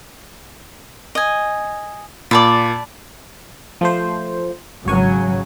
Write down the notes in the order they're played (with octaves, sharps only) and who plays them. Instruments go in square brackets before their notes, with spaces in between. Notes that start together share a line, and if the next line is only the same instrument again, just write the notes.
[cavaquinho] D#5 G#5
[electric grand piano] A#2 [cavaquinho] D5 A5 B5
[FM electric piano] F3 A3 C5
[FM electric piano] G#1 C#5 G#5 [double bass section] C#3 F#3